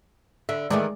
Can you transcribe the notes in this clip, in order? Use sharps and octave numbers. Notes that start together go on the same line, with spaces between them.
D3 E5
D#3 E3 G#3 A3 D5